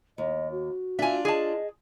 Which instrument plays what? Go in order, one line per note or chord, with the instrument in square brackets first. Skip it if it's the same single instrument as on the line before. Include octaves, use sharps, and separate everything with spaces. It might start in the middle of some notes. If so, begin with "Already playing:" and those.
[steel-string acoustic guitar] D#2 [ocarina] D#5
[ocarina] F#4
[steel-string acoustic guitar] D4 F4 [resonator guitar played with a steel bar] E5 G#5
[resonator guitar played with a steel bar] G#4 A5 [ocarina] D#5